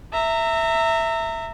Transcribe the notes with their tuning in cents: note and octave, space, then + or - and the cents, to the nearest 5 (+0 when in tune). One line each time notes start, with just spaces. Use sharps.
E5 +0 A#5 -30